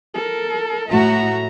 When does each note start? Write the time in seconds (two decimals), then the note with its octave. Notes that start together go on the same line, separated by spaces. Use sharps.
0.14 A4 A#4
0.89 A2 A3 F#4 E5 A#5